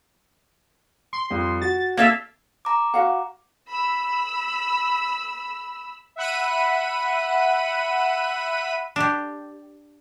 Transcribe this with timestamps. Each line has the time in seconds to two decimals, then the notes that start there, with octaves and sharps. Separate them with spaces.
1.13 C6
1.30 F2 G3
1.61 F#4 A6
1.97 A#3 A4 E5 F5
2.65 A#5 D6
2.94 F#4 F5 F#5
3.69 B5 E6
6.16 E5 F#5 B5 D#7
8.96 D4 G4